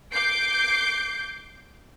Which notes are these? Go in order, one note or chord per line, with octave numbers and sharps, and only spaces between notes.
D6 G6 C7 D7